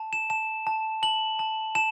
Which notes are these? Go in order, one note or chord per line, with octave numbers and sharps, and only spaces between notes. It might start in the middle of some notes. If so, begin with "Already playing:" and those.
Already playing: A5
E7
A5 E7
A5
A5 F#7
A5
A5 E7